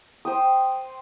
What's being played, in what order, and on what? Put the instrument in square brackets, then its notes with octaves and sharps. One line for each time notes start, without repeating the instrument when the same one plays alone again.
[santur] C5 G5 D#6